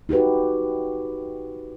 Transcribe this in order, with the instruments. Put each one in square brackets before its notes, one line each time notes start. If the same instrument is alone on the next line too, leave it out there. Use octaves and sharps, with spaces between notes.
[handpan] D#4 F#4 G4 B4